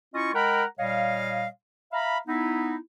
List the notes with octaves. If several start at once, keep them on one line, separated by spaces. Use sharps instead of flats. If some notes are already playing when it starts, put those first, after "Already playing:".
C#4 E4 F4 D#5 C#6
G#3 A#4 F#5 G5 A#5 B5
A#2 G3 C#5 D#5 F5
E5 F5 A#5 B5
B3 D#4 E4